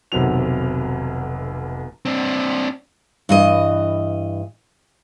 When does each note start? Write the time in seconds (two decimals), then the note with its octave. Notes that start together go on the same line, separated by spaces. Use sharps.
0.12 F1 B1 C3 D#3 F#3 F7
2.05 C4 D4
3.29 G2 E3 D#5